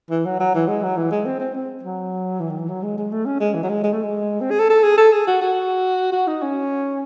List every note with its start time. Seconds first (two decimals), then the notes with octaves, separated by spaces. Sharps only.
0.10 E3
0.25 F#3
0.40 F#3
0.54 E3
0.68 G#3
0.83 F#3
0.97 E3
1.11 G#3
1.26 C4
1.40 C4
1.55 C4
1.83 F#3
2.40 E3
2.50 D#3
2.59 E3
2.68 F#3
2.83 G#3
2.98 G#3
3.12 A3
3.26 C#4
3.40 G#3
3.54 E3
3.63 F#3
3.69 G#3
3.84 G#3
3.93 A3
4.03 G#3
4.41 C4
4.51 G#4
4.59 A4
4.70 A4
4.83 G#4
4.98 A4
5.13 G#4
5.27 F#4
5.41 F#4
6.12 F#4
6.27 D#4
6.42 C#4